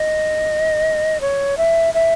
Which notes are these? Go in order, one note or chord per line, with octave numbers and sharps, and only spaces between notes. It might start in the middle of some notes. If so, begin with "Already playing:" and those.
Already playing: D#5
C#5
E5
E5